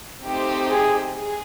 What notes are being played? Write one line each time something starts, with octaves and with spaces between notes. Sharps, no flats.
A3 C4 D#4 G4 C5
G#4
G#4